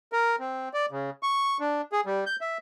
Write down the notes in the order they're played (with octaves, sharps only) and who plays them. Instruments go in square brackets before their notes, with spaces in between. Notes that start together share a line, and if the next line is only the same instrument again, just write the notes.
[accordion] A#4
C4
D5
C#3
C#6
D4
G#4
G3
G6
E5